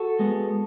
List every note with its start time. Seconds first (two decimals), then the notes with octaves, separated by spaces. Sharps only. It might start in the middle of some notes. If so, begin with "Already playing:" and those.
Already playing: F#4 A4
0.19 G#3 B3